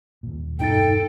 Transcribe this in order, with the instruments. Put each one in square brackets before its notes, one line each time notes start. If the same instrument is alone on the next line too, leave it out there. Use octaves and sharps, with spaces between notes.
[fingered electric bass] D#2 A#2
[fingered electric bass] E1 B2 [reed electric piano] G2 D#4 A6 [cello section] A4 [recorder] G5